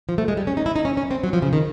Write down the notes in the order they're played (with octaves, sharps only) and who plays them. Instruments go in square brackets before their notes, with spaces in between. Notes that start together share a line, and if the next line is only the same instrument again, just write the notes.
[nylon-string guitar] F3
A3
G#3
G3
C#4
D#4
E4
D#4
C#4
C#4
C4
F#3
F3
C#3
D#3